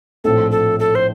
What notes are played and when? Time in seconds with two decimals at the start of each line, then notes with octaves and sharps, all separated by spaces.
0.24 A#1 A2 F3 C4 A4
0.51 A4
0.80 A4
0.95 C5